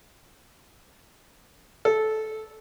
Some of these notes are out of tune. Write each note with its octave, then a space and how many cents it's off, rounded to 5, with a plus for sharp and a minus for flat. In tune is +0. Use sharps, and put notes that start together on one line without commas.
A4 -15